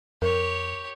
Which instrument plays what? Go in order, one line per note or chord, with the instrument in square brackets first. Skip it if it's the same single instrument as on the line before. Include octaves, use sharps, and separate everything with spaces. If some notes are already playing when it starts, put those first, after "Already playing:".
[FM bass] F2 [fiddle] G4 C#5 [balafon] A#4